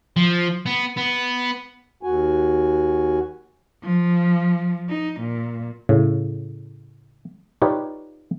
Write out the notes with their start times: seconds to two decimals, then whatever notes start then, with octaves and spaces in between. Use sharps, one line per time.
0.17 F3
0.66 B3
0.97 B3
2.03 D#2 F#4 G#5
3.83 F3
4.89 D#4
5.20 A#2
5.89 A2 C#3
7.62 D#4 F4 G4 B4 C#5 D5